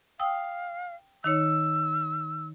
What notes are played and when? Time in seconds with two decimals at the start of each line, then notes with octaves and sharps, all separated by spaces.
0.19 F5 G5 D#6 E6
1.24 D#3 D#4 C#5 E6